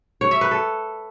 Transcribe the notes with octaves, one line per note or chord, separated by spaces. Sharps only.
C#5
E5
B4
A4